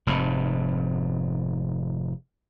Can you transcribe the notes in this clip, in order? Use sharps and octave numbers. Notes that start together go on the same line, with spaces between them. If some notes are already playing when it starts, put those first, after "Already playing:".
F1 G#2